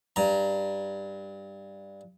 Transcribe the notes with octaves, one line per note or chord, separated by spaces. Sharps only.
G2 A#5